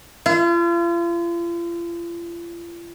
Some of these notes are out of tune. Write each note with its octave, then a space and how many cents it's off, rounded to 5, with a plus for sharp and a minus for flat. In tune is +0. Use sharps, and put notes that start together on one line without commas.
F4 -40